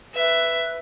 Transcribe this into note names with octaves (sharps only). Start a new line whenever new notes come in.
B4 E5